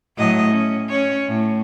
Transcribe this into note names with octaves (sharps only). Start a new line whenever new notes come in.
A2 F#3 D#5
C#4
C#4 C#5
A2